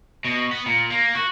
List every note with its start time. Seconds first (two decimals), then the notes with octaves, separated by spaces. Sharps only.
0.25 B2
0.51 B3
0.66 A#2
0.90 A#3
1.15 F#4